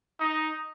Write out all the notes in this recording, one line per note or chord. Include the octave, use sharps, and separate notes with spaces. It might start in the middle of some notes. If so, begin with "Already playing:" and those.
D#4